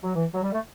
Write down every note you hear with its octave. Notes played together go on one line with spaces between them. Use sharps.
F#3
E3
F#3
G3
A3